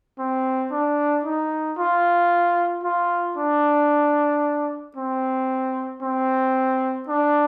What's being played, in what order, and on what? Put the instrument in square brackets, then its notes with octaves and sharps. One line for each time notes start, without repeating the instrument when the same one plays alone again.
[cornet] C4
D4
D#4
F4
F4
D4
C4
C4
D4